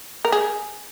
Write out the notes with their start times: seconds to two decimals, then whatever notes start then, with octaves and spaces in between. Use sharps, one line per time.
0.25 A#4
0.32 G#4